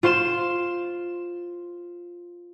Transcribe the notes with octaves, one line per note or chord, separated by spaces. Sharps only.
F4 C5 C6 E7